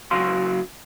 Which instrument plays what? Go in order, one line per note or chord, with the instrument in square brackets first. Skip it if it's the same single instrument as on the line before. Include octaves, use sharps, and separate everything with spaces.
[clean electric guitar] C#3 F#3 F#4 F5 C6